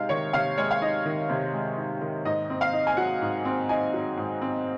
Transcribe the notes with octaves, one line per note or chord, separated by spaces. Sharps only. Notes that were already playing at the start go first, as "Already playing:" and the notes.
Already playing: C3 G#3 D#4 F5
D#3 C#5
C3 F5
G#3 C#5
F5
D#4 D#5
D#3
C3
G#3
D#4
D#3
G#2 D#5
C4
F5
D#4
G#5
F#3 F#5
G#2
C4
D#4 G#5
F#3
G#2
C4